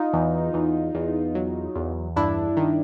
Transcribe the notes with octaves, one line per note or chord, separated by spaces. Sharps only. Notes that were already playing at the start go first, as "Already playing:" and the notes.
Already playing: D#4 F4
E2
E2
E2
F#3
E2
G2 D4 E4
D#3